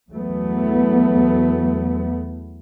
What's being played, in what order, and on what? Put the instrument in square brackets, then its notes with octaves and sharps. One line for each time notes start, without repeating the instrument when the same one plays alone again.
[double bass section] E2 F#3 A3 B3